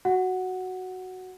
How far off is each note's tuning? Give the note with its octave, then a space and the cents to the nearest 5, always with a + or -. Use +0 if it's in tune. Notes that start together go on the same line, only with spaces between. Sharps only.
F#4 +0 F#5 +0